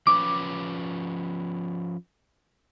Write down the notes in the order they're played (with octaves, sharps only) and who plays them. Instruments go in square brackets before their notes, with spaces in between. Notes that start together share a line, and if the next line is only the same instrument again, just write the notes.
[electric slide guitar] F3 C#4 B4 [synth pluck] D6